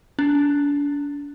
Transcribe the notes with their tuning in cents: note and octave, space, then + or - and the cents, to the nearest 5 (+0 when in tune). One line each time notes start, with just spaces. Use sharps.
D4 -35